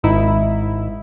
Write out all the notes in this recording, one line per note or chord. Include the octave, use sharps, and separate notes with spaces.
G#1 G#2 D#4 E4